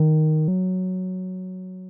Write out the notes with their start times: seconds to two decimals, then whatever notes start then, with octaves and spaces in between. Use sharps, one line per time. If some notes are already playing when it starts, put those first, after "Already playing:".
Already playing: D#3
0.48 F#3